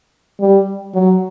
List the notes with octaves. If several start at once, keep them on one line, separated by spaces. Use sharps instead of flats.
G3
F#3